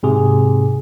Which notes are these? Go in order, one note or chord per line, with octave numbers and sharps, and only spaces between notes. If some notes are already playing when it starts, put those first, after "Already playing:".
G#2 C3 G#4